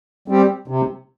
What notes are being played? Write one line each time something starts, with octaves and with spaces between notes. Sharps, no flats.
G3 C4 G4
C3